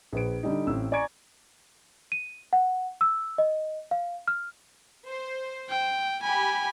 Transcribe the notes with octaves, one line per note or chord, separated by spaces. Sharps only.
A#1 B4 D7
D3 G3 D#4
A1 C4 E6
D5 G#5 A#5 C#6 G#6 D7
D#7
F#5
E6
D#5
F5
F6
C5
G5
G4 G#5 B5